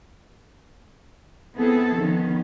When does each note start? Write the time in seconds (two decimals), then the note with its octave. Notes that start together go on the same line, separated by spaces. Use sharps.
1.54 B3 C4 E4 G#4 A4
1.94 D#3 F3 B3 C#4